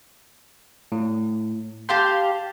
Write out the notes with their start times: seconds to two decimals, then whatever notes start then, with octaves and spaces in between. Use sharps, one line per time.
0.92 A2
1.89 G4 F5 A5 C6 G6